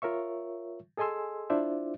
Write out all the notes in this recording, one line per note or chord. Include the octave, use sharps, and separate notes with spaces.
F4 A#4 C#5 E5 C#6
G#4 A4 D#5 G#5 C6 E6
D4 E4 F4 C5 D5 E5